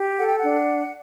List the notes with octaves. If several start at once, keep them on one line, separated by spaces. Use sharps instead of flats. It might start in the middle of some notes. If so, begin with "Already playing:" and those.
Already playing: G4
A4 F#5
G5
D4 F#5